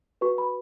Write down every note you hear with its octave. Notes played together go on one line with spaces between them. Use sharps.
F#4 B4 C#6
B5